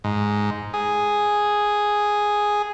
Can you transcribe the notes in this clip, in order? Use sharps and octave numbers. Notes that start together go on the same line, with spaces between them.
G#2
G#4